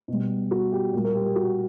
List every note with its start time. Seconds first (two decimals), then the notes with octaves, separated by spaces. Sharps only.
0.08 B2 G3
0.51 F#4
0.72 G4
0.93 A#2 G3
1.04 A#4
1.15 G4
1.26 G4
1.35 F#4